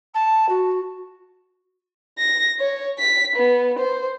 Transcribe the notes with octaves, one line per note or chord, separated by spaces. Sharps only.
A5
F#4
A#6
C#5
B6
B3
C5